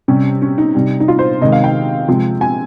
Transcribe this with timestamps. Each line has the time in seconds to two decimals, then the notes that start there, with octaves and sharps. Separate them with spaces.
0.08 C3 G3 C#4
0.42 C#4
0.58 D#4
0.75 C3 G3
1.00 D#4
1.08 F4
1.19 C5
1.41 C3 D#3 G#3 D#5
1.52 F5
1.64 G5
2.08 C3 F3 G#3
2.41 G#5